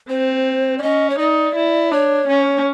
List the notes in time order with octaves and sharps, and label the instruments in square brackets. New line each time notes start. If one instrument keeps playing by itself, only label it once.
[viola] C4 [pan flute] C5
[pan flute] D5
[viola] C#4 [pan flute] D#5
[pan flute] C#5
[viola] D#4 [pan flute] D5
[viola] E4
[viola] D4 [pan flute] C#5
[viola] C#4